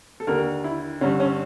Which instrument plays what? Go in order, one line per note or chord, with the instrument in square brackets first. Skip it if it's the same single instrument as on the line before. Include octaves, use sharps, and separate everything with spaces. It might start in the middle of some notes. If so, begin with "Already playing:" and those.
[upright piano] A4
D#2 D3 A#4
E4
G2 D3 C#4
C#4